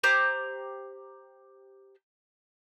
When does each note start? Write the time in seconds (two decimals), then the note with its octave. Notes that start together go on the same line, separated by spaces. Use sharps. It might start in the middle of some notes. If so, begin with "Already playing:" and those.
0.04 G4 C5 A#5 D6